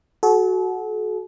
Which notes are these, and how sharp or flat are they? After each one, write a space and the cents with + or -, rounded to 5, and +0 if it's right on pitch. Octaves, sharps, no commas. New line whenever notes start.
F#4 +0 A4 -40